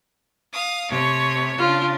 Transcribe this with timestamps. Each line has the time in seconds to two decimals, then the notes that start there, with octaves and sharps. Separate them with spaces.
0.50 F5 D#6
0.89 C3 A3 C#5
1.58 C#3 D4 F4